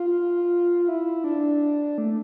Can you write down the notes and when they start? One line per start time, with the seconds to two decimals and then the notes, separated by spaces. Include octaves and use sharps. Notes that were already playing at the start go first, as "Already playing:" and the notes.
Already playing: F4
0.88 E4
1.24 D4
1.98 A3